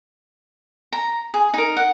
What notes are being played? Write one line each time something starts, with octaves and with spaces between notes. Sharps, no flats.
A#5
G#4
D#4 A#4
F#5